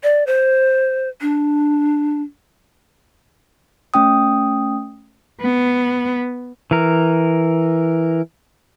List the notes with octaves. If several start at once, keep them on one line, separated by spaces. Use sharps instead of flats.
D5
C5
D4
A3 C#4 G5 D#6
B3
E3 A#4